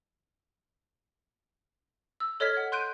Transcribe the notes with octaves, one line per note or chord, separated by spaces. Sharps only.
E6
A4 C#5 D#5 F6 G#6 B6
F#5
C6 F#6 G6 D7 D#7